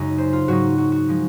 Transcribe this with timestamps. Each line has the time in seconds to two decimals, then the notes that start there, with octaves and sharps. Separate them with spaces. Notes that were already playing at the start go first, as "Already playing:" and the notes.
Already playing: F#2 C#3 G#3 D#4
0.18 C5
0.33 F4
0.48 G#2 F#3 C4 D#4 F#4
0.78 F#4
0.92 F#4
1.08 F3 G#3